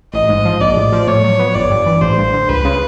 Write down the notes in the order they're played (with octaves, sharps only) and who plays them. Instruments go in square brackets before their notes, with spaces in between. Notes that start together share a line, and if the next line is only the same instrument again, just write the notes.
[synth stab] A1 [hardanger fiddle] D#5
[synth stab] G#2
F3
[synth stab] A#1 [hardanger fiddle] D5
[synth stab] A2
F3
[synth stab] A2 [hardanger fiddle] C#5
[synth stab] F#3
B3
[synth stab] G1 [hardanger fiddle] D5
[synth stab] G2
E3
[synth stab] A1 [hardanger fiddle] C5
[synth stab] G2
D3
[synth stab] C#2 [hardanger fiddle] B4
[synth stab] C#3